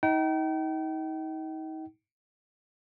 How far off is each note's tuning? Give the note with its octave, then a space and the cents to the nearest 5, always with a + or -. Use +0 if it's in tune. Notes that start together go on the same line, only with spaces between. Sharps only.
D#4 +30 G5 -35